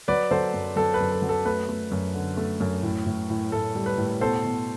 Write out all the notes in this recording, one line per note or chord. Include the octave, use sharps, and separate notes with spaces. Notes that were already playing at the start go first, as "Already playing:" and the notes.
F#3 B4 D5
F#3 A4 C5
F#2
F#3 A4
B4
F#2
A4
F#3
A4
A3 B4
A3
F#2
D3
A3
F#2
A2
A2
A2
A2 A4
G3
B4
A2
B2 A4 C5
B2